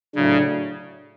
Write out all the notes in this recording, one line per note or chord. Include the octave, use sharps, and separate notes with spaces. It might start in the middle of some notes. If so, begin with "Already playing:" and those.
A2 C#3 F#3 A3 D4